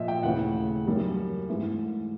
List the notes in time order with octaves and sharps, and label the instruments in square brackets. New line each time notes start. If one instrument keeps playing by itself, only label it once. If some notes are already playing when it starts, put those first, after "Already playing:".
Already playing: [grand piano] A#2 F3 D#5 E5
G5
D#2 C#3 E3 A3 F#5
F#2 D#3 G3 A#3
G#2 E3 A3